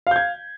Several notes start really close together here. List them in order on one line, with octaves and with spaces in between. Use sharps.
F5 G6 G#6